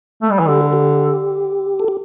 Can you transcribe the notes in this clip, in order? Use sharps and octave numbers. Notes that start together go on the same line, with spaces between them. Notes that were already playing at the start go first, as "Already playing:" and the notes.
A3
G3
E3
D3 G4
A4
G4
A4
G4